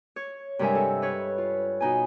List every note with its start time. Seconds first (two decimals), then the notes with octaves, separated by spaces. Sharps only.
0.16 C#5
0.59 G2 C3 G#3 A#4 E5 G#5
0.75 A4
1.02 B4 C#5
1.38 F4
1.80 B2 D#4 G#5